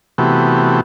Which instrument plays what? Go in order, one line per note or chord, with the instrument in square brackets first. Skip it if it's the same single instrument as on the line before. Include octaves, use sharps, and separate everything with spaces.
[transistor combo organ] C3 E3 A3 B3 F#4 G4